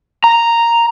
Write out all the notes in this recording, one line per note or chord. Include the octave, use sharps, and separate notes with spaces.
A#5